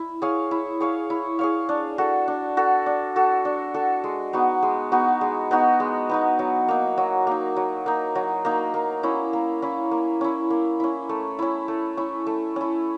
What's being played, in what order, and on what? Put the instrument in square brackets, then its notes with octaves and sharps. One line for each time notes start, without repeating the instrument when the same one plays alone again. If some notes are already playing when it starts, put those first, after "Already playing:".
Already playing: [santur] E4
G#4 C#5 F5
E4
G#4 C#5 F5
E4
G#4 C#5 F5
D4
F#4 A4
D4
F#4 A4
D4
F#4 A4
D4
F#4 A4
G#3
B3 D#4 F#4
G#3
B3 D#4 F#4
G#3
B3 D#4 F#4
G#3
B3 D#4 F#4
F#3
A#3 D#4
F#3
A#3 D#4
F#3
A#3 D#4
F#3
A#3 D#4
A#3
C#4 E4
A#3
C#4 E4
A#3
C#4 E4
A#3
C#4 E4
A3
C#4 E4
A3
C#4 E4
A3
C#4 E4